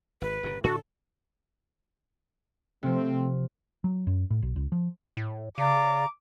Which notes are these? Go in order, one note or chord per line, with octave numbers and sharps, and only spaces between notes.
G#1 B4
G1 A#2 C#3
A2 D3 D4 F#4 A4
C3 F3 A3 C4
F#3
F#2
A2
B1
C#2
F3
A2
C#3 D5 F5 A#5 D6